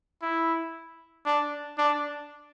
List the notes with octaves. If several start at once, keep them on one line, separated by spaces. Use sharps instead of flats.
E4
D4
D4